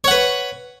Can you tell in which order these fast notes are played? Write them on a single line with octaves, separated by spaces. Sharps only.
C#5 F#5 B4